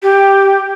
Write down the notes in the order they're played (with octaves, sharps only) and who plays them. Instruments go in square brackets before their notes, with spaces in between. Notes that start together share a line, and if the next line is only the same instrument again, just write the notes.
[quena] G4